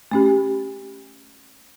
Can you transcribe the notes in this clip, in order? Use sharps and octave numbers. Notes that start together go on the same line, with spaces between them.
A3 C#4 G4